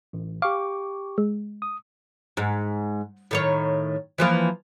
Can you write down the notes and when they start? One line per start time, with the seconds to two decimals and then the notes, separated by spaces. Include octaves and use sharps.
0.13 A1
0.42 G4 F5 C#6 D6
1.18 G#3
1.62 D#6
2.37 G#2
3.31 A2 D#3 C#5
4.18 E3 F3 A#3